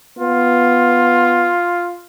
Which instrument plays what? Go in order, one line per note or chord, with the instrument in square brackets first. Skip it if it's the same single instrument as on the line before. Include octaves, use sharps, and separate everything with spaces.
[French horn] B3 [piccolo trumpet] F4